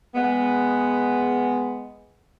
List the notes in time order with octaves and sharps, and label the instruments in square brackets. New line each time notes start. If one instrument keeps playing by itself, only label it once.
[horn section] G#3 B3